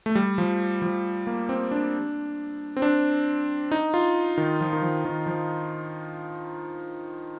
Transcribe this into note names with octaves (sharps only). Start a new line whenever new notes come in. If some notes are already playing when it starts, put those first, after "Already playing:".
A3
G3
F3
F3
A#3
C4
D4
C4
D4
D#4
F4
D#3
F3
D#3
F3
D#3
F3